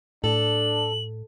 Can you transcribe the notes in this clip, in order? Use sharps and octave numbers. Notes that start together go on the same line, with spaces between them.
A2 D4 A4 F#7